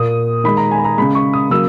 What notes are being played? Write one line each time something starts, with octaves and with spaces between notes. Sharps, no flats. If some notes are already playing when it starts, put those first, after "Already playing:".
Already playing: A#2 A#3 D#6
D#3 G#3 B5
A#5
G#5
B5
A#5
C#3 G#3 B5
C#6
D#6
C#3 F#3 A#3 E6